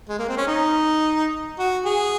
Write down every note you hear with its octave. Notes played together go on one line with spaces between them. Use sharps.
G#3
A#3
C4
C#4
D#4
F#4
G#4